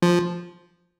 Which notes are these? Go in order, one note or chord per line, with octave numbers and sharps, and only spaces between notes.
F3